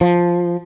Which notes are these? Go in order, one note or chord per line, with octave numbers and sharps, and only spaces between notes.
F3